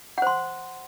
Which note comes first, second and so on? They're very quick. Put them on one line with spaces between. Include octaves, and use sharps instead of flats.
F#5 C5 C6